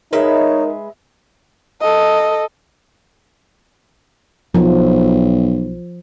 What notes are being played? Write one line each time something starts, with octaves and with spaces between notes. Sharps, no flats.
G#3 D#4 A#4 B4 C#5 E5
A4 D#5
B1 F3